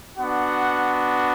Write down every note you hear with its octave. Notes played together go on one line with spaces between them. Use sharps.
B3 D4 F#4 F#5